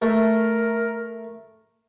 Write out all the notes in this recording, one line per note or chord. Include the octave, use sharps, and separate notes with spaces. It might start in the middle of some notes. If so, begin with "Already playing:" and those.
A3 A#4